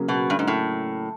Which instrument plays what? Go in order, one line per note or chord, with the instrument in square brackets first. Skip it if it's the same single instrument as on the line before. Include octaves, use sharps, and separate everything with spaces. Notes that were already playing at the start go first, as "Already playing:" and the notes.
Already playing: [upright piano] C#3 F#3 A#3
[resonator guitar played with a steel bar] B2
G2
G#2
A2